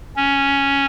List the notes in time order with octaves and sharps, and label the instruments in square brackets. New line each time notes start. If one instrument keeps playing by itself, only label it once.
[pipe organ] C#4